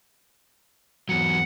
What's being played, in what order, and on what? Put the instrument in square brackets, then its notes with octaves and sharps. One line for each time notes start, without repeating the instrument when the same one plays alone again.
[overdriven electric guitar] E2 F#3 [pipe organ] F#5